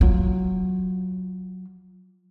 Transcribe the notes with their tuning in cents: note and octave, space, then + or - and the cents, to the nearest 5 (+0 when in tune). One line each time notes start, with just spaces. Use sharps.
F#3 +0 F4 +10